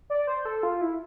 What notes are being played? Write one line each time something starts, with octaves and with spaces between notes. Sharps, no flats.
D5
C5
A4
F4
E4